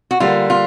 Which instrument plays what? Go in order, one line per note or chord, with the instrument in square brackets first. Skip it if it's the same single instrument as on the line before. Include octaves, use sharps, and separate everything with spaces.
[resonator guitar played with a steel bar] F#4
[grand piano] D3 G3 A#3 [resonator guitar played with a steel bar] F4
[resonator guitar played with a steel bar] F4